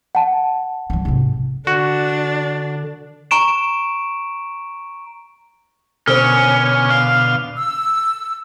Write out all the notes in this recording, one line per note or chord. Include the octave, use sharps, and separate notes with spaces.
F#5 A5
D#3 F#3
G#2 C3
D3 D4 F#4
A#5 C#6 D7 E7
B2 D3 C#4 A#4 C5 F6
F5 F6
E6